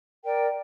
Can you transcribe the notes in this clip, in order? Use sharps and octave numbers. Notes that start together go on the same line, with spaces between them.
A#4 D5 G5